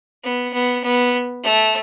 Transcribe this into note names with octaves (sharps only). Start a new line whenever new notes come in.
B3
B3
B3
A3